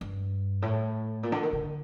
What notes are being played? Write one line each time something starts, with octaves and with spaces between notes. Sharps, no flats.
G2
A2
A#2
D3
D#3
D3